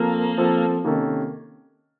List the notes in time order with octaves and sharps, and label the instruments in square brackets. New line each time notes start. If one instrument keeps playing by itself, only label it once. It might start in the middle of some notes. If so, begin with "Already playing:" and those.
Already playing: [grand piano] F3 C4 F4 A4 [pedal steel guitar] A#3
[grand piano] F3 C4 F4 A4
C3 D#3 A#3 C#4 A4